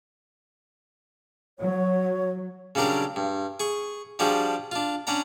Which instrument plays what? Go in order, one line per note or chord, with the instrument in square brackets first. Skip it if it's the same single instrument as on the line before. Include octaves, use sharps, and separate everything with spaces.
[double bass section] F#3 [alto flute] C#5
[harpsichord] C#3 F#3 G3 D4 A#4
G2
G#4 C#6
F3 G3 D4 F#4 G#4
D4 F4
C#4 D4 F#5 A#5